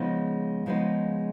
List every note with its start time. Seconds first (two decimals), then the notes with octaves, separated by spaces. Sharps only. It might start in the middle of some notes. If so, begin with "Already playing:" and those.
Already playing: C#3 F3 G#3 B3 D#4
0.66 C#3 F3 G#3 B3 D#4